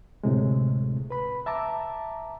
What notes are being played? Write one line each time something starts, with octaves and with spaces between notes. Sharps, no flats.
D2 A2 C3 G#3
B4 B5
E5 A5 A#5 D6